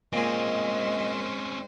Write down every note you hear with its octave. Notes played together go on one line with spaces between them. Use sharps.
A#2 G#3 C4 C#4 G#4 C5 D#5